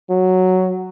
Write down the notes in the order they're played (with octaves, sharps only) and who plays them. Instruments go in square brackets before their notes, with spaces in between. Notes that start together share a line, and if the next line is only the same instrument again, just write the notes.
[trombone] F#3